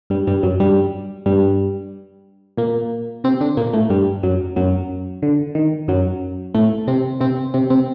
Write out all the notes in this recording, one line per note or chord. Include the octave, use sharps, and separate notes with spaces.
G2 G3
G2 G3
F#2 F#3
G2 G3
G2 G3
A#2 A#3
C3 C4
D3 D4
A#2 A#3
A2 A3
G2 G3
F#2 F#3
F#2 F#3
D3
D#3
F#2 F#3
A2 A3
C3 C4
C3 C4
C3 C4
C3 C4